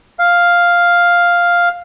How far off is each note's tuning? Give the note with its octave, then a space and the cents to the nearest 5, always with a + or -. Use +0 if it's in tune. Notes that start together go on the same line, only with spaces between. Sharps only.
F5 +0